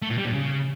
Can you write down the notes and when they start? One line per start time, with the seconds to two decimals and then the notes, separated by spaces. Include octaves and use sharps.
0.02 A3
0.10 A#2
0.18 G3
0.25 A#2
0.33 C#3